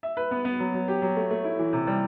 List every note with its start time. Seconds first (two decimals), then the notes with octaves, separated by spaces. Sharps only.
0.03 E5
0.17 B4
0.31 B3
0.45 B3
0.59 F#3
0.74 F#3
0.88 G4
1.02 F#3
1.16 A3
1.30 A3
1.44 E4
1.59 E3
1.73 C3
1.87 G3